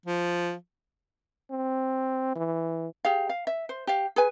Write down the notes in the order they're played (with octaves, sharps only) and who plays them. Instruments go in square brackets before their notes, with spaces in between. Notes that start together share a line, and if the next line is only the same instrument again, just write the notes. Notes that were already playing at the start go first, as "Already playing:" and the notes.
[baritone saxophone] F3
[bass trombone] C4
E3
[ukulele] G4 G#4 F5
F5
E5
C5
G4 F5
G#4 B4 G#5